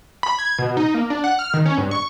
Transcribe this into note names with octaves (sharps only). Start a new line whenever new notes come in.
B5
G#6
B2
D#4
A#3
D4
F#5
F6
D#3
C#4
G2
C#6